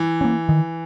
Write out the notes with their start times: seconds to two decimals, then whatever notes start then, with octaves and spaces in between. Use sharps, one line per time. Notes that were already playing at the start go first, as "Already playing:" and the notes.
Already playing: E3
0.21 A#3 C#4
0.49 D#3